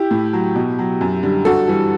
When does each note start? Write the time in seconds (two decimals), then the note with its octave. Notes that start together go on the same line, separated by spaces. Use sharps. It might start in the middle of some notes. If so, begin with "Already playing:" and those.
Already playing: E4 G4
0.11 A2
0.33 F#3
0.56 B2
0.79 F#3
1.01 F#2
1.23 D3 G3
1.45 G2 F#4 A4
1.68 E3 G3